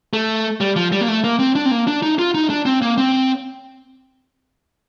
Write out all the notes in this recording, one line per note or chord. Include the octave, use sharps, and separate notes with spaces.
A3
G3
F3
G3
A#3
A3
A#3
C4
D4
C4
A#3
D4
D#4
F4
D#4
D4
C4
A#3
C4